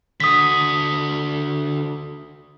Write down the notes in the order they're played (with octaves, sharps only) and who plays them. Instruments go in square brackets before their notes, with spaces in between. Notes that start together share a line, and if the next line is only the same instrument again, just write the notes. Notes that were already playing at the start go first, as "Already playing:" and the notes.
[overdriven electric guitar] D3 F#4 [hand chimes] D#6 B6